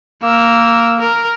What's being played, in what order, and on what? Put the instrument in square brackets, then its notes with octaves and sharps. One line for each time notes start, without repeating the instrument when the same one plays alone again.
[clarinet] A#3 [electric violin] A#4 E6
[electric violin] A#4